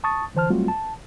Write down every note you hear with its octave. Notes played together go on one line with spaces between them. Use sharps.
A5 C#6 D#6 A6
D3 E3 C5 A5 F6
F#3 G3 A3 C4 F4 F#4
A5